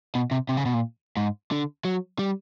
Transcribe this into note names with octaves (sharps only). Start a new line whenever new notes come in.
B2
C3
C3
C#3
B2
A#2
G#2
D3
F#3
G3